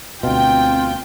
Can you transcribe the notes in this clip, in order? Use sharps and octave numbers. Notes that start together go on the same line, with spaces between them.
D2 B2 C4 F4 G5